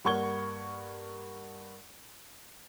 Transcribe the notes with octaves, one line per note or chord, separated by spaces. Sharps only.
G2 A#3 F#5 C#6 G#6 G7